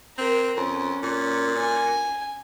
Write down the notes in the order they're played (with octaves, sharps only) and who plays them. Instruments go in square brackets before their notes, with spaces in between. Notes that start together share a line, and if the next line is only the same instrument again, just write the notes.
[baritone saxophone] C4 [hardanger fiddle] A#4
[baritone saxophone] F2 [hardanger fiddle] C#4
[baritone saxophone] A#2
[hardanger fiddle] G#5